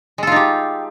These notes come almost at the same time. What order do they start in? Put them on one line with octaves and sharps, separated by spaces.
G#3 A4 F4 D#4 G4